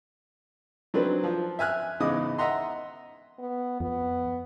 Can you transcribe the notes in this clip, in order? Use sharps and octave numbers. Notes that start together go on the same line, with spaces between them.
F#3 C4 D4 D#4 B4
F3
E5 G#5 F6 F#6
E2 G#2 C#3 D#5 D6 D#6
D#5 E5 F#5 A#5 C6
B3
F2 B3